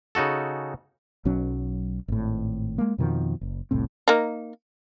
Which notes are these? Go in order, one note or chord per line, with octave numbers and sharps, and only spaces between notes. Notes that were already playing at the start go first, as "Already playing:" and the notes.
C#3 D#4 F#4 A4
B1 F#3 C#4
G#1 A2
G#3 A#3
F2 B2 D#3 F3
F#1
F1 C2 A2 C4
A#3 D#4